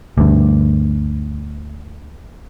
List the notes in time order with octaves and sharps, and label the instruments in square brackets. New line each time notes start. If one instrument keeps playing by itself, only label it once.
[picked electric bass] D2 G2